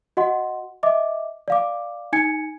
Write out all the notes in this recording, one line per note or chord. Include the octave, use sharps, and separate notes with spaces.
F#4 D#5 F#5 C6
D#5 E5 D6
D5 F5 D6
D#4 G#5 G#6 C#7